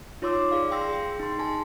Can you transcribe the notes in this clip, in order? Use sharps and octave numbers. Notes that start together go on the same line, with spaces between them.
D#4 F4 C#5 C6 D6 E6
G#4 D5 F5
G5 C6 E6 A#6
G#4 G5
D#4 C6
G#4 G#5 A5 C6